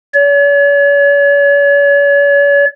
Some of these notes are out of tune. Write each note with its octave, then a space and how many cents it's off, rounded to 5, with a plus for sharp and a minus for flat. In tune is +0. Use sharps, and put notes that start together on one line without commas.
C#5 +45